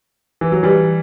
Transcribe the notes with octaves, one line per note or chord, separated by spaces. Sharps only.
E3
F#3
E3 G3